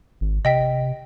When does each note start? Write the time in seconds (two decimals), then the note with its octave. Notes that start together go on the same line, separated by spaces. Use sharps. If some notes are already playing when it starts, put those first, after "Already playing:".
0.21 G#1
0.45 C3 D#5 G5 B6